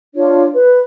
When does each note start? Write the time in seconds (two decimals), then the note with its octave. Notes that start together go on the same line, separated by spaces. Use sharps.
0.15 D4 F4 C#5
0.54 B4